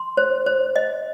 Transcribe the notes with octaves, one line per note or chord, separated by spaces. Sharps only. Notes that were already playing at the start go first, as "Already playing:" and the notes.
Already playing: C6
C5
C5
D#5